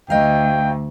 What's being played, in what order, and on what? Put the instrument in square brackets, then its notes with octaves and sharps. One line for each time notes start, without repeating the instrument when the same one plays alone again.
[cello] D2 [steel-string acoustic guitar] D#5 F5 [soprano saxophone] G5